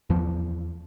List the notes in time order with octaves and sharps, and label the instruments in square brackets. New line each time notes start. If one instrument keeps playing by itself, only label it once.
[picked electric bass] E2 F3